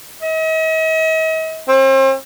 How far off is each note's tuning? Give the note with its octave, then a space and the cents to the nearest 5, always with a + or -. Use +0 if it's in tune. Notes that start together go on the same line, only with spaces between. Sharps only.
D#5 +45
C4 +40